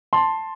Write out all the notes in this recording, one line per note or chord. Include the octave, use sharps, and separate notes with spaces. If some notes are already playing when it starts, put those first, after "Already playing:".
A5 C6